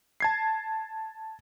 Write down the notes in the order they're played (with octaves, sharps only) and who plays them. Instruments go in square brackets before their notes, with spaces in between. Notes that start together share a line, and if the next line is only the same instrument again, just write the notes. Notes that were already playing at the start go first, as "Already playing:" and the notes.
[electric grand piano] A5 G#6 C7